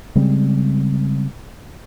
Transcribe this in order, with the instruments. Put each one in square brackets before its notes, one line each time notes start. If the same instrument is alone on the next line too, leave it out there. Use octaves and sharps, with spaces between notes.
[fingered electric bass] C#3 G3 G#3 C4